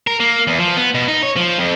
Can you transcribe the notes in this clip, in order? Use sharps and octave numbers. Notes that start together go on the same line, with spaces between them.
A#4
A#3
E2
F3
B3
B2
D#4
C#5
F3
F2